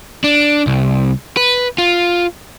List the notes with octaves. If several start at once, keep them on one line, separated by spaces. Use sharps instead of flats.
D4
C2
B4
F4